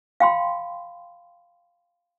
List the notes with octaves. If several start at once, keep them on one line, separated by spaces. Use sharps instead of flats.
F5 G5 B5 C6